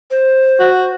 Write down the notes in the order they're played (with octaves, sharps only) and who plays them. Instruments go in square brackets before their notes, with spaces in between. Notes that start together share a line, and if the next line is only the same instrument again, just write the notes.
[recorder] C5
[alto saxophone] F#4